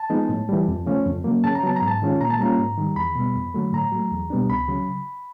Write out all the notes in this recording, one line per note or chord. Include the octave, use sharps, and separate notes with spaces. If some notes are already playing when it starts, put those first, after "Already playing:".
Already playing: A5
F3 G#3 B3 D#4
A2
E3 G3
F2
C#3 F3 A3 C#4
F2
C#3 F#3 A#3
C#3 A5
A#5
F#3 B3 A5
A#5
G#2
A5
D#3 G#3 C#4 F4
A#2 A#5
A5
G3 A#3 C#4 F4 A#5
G#2
D#3 G3
E2 B5
B2 G3 B3
F2
D3 F#3 A3
A2 A#5
F#3 A3
E2
B2 G3 B3 D4
C#2 B5
C#3 F#3